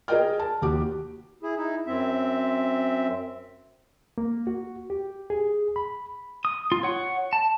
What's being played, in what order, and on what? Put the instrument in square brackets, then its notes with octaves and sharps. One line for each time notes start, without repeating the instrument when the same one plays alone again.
[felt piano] G#4 A#4 D5 D#5 G5 F6
A5
D#2 F#4 G4 D6
[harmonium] E4 G#4
D#4 E4
F#2 C4 E5
[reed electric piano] A#3
F#4
G4
G#4
B5
[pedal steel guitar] D#6
F4
C#5 F#5
A5